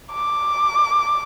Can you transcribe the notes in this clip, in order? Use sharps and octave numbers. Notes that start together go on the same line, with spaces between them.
D6